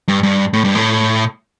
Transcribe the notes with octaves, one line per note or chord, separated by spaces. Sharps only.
G2
G2
A2
G2
A2